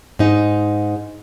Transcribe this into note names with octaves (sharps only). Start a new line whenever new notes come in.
G#2 D#4